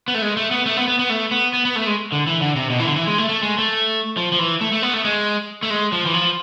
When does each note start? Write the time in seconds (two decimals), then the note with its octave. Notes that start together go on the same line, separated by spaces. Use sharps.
0.08 B3
0.14 A3
0.22 G#3
0.37 A3
0.51 B3
0.66 A3
0.77 B3
0.88 B3
0.99 B3
1.10 A3
1.31 B3
1.54 B3
1.65 B3
1.76 A3
1.87 G#3
2.12 D3
2.27 E3
2.41 D3
2.56 C3
2.70 B2
2.80 E3
2.85 D3
2.96 E3
3.07 G#3
3.18 A3
3.29 A3
3.43 G#3
3.58 A3
4.17 F3
4.32 F3
4.39 E3
4.61 A3
4.72 A3
4.82 B3
4.93 A3
5.05 G#3
5.63 A3
5.70 G#3
5.92 F3
6.06 E3
6.14 F3